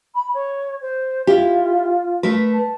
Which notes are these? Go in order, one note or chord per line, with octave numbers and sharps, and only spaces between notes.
B5
C#5
C5
E4 F4 G4
A3 A#4 B4
A5